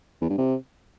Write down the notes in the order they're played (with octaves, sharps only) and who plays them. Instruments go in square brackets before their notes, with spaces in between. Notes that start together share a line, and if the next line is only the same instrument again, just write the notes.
[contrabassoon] E2
G2
C3